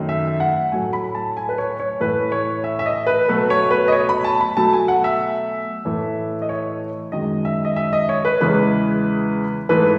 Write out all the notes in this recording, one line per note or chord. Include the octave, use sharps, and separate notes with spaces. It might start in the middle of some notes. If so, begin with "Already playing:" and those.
Already playing: F#2 D#3 A3
E5
F#5
A2 F#3 A3 G#5
B5
A5
G#5
B4
C#5
C#5
A2 E3 A3 B4
C#5
E5
E5
D#5
B4
B2 F#3 A3 B4
C#5
B4
D#5
C#5
B5
A5
B5
B2 F#3 A3 A5
G#5
F#5
E5
A2 E3 A3
D#5
C#5
F#2 D#3 G#3 D#5
E5
D#5
E5
D#5
C#5
B4
E2 C#3 E3 G#3 B4
G#2 E3 A3 B4